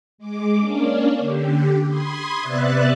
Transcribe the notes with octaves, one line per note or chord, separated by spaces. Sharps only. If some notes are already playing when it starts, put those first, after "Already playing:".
G#3 D6
A#3 C#4 D4
D3 G4
B5 C6 D#6 G#6
C3 B3 D5 E5 F#6 A6